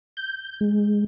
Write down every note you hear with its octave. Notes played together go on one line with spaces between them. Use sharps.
G6
G#3